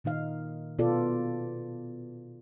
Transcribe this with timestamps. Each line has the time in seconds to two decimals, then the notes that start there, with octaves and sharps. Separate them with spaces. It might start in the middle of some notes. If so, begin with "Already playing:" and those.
0.04 A#2 D#3 D#4 F5
0.79 B2 B3 F4 A4 D5